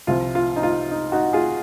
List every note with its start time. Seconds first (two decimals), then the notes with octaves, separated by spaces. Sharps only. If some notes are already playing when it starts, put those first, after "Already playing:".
0.07 C2 C3 F3 F4
0.35 F4
0.56 D#4
0.63 F4
0.91 D#4
1.12 D#4 F#4
1.33 F4 G#4